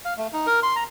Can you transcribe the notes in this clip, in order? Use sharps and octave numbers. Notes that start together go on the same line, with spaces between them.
F5
A3
D#4
A#4
C6
A#5